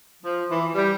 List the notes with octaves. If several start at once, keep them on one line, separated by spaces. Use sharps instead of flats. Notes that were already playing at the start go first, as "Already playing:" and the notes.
F3
E3
G3